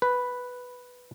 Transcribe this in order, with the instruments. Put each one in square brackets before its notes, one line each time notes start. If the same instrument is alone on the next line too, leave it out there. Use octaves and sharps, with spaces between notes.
[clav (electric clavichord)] B4